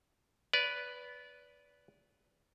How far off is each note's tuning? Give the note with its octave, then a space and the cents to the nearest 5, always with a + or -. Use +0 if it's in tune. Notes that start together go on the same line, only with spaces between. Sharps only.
B4 +0 D5 -25